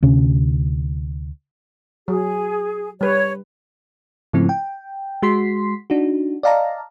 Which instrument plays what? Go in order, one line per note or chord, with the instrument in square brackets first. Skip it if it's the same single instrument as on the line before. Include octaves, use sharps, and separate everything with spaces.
[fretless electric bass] D2 C3 C#4
[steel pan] F#3 [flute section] G#4
[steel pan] G3 B4 [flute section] C#5
[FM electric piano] G#2 C#3 F3 A3 C4 E4
G5
G#3 F#4 C6 B6 C7
D4 D#4 F#4
D5 D#5 F5 A5 A#5